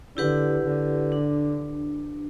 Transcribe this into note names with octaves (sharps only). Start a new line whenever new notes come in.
D3 E4 G4 B4 F#5
D3
D4